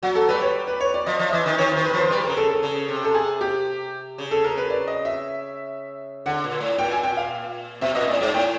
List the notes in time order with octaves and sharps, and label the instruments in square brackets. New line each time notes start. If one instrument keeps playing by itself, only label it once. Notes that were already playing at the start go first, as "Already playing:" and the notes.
[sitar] F#3 [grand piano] F#4
[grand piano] A4
[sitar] G3 [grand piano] B4
[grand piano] C#5
B4
C#5
D5
[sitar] F3 [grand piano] D#5
[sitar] F3
[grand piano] E5
[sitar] E3 [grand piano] D#5
[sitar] D#3
[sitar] D#3 [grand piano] C#5
[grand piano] C5
[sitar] D#3
[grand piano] B4
[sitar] F3 [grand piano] C5
[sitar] G3 [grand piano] B4
[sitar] C#3 [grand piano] A#4
[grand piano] A4
A4
[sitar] C#3
C3
[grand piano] A4
G#4
G4
[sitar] C#3
[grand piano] A4
A#4
B4
D5
D#5
E5
[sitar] D3 [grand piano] F#5
[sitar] A#2
A2
[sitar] A#2 [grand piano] G5
[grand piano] G#5
G5
F5
[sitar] B2 [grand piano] E5
[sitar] A#2 [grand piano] D#5
[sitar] A2 [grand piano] D5
[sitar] G#2 [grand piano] D5
[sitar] A2 [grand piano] G5